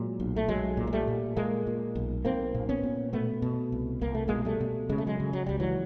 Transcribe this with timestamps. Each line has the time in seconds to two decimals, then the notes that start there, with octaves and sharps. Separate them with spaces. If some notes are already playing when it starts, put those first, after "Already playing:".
Already playing: A#2 F#3 G#3
0.20 B1
0.36 A3
0.48 B1 F#3 G#3
0.77 A#2
0.87 G#3
0.93 G3 A3
1.08 A#2
1.36 A#2 G#3 A#3
1.67 A#2
1.95 B1
2.25 B1 A#3 C4
2.55 A#2
2.69 B3 C#4
2.83 A#2
3.13 B2 A3 B3
3.42 B2
3.72 C2
4.01 C2 A#3
4.15 A3
4.28 B2 G#3 A#3
4.45 G3 A3
4.60 B2
4.89 C#3 G#3
4.98 A3
5.07 F#3 G#3
5.20 C#3
5.33 F#3
5.46 C#2 G3
5.60 E3 F#3